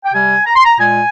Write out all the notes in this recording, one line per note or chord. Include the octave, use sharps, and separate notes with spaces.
G5
C3 G3 G#5
A#5
C6
A#5
A#2 G#3 G#5